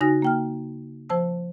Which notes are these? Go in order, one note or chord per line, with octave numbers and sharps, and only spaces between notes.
C#3 D#4 F#4 G#5 A#6
A#3 G5 F6
F3 C5 A5 E6